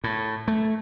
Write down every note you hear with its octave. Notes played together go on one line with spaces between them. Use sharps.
A2
A3